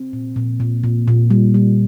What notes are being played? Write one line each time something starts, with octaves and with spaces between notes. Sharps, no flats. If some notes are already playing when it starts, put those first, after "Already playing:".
Already playing: C4
A#2
A#2
A#2
A#2
A#2
G3
G3